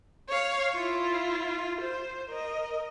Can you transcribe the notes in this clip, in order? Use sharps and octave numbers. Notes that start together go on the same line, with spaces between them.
C#5 F5
E4 F4
C5
A#4 D#5